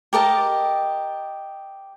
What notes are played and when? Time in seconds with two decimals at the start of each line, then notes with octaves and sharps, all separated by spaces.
0.13 G4 A#4 D#5 A5